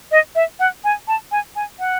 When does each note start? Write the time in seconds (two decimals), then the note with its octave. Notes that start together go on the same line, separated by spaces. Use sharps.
0.12 D#5
0.35 E5
0.60 F#5
0.84 G#5
1.08 A5
1.32 G#5
1.56 G#5
1.79 F#5